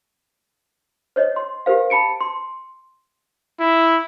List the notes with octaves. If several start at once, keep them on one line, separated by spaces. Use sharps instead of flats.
C5 C#5 D#5
C6
G4 A#4 C5 F5
A5 B5 C#7 D7
C6
E4